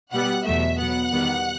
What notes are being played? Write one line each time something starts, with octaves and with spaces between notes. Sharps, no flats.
B2 G3 B3 F#5
E2 B2 F#3 A3 E5
B2 F#3 B3 F#5
E2 D#3 G3 B3